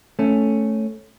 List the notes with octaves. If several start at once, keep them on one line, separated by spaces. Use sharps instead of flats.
A3 C#4